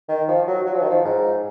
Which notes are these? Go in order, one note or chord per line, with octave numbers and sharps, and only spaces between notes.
D#3
F3
F#3
F#3
F3
D#3
F3
G#2